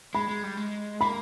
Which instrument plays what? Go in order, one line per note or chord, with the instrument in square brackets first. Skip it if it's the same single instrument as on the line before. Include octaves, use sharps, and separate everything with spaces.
[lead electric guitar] G#3 [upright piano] B5
[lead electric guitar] G#3
G3
G#3
[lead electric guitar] A#3 [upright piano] B5